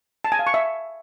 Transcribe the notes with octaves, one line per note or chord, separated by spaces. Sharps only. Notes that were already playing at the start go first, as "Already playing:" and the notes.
A5
G#5
F5
C#6
E5